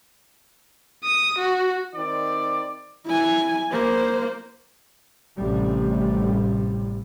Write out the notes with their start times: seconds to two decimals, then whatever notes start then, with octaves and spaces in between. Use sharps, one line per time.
1.04 D#6
1.38 F#4
1.93 D#3 C4 D5
3.06 E4 G#5
3.72 A#3 C5
5.37 A1 A2 C3 G3